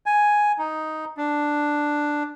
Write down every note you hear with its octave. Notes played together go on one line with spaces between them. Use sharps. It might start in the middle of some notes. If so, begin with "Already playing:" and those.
G#5
D#4
D4